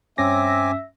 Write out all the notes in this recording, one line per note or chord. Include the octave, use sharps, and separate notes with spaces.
G2 C4 C#4 E5 G#5 D6 A#6